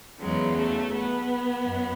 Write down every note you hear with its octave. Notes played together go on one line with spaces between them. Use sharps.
E2 C#3 F#3 G#3
A3
B3
F#2